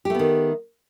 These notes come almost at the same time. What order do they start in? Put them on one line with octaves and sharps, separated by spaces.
G4 A3 B3 D#3